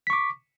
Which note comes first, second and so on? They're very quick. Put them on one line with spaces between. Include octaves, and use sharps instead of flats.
B6 C#6 D6